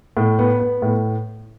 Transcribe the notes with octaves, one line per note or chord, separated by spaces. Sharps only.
A2
B3
B3
A2